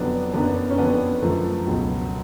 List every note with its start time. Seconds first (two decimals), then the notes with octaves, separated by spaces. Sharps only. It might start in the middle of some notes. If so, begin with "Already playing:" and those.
Already playing: F2 D3 F#3 B3 D4
0.33 F#2 D3 F#3 B3 D4
0.70 C#4
0.77 F2 D3 F3 B3 D4
1.22 F#2 D3 F3 A3
1.67 C#2 B2 F#3